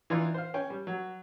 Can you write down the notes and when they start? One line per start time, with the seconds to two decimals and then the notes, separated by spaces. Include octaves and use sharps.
0.10 E3 D4 D#4 F4
0.34 C5 F5
0.54 C#4 G5
0.70 G3
0.87 F#3